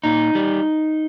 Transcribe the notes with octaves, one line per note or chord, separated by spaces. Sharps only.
A#2 D#4
G3